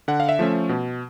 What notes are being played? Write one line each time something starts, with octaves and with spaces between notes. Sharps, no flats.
D3 F#5
F5
E5
F3 A3 C#4
B2